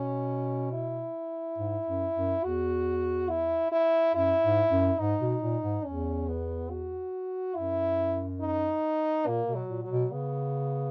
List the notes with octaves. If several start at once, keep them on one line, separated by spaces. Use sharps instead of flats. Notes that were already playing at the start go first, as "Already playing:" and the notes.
Already playing: B2 C#4
E4
G#2
F#2
F#2
E2 F#4
E4
E4
F#2 E4
G#2
F#2
G#2 D#4
B2
A#2
G#2
E2 C#4
B3
F#4
F#2 E4
D#4
A#2 A#3
B2
F#3
A#2
F#3
B2
C#3 B3